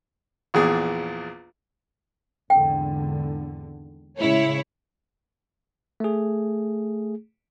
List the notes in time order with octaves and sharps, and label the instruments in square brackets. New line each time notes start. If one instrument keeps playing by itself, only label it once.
[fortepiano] A#1 E2 G#4
[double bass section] G#1 E2 D3 [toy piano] G5
[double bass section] A2 C#3 G#3 [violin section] E4 C#5
[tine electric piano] A3 G#4